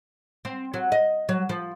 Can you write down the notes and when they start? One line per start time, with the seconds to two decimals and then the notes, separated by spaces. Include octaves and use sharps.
0.45 C4
0.74 F#3
0.92 D#5
1.29 F#3
1.49 F3